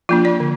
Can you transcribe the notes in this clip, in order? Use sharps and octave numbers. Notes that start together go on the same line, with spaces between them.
F3 A#3 D4 F4
D5
D3